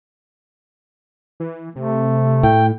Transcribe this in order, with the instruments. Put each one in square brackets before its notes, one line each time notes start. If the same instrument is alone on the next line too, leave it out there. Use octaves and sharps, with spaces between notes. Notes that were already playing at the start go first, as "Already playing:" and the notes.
[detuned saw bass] E3
[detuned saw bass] C3 [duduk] A3
[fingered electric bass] A2 [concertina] G5